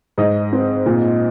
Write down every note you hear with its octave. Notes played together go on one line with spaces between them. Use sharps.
G#2 D#5
C4
A#2